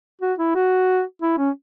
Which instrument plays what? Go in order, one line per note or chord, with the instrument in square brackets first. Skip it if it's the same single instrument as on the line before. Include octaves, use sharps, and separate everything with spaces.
[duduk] F#4
E4
F#4
E4
C#4